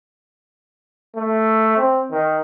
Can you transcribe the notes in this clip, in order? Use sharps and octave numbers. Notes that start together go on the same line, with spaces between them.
A3
C4
D#3